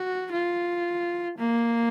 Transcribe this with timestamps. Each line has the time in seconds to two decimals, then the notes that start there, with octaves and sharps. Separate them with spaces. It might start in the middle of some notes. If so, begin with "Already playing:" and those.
Already playing: F#4
0.32 F4
1.38 A#3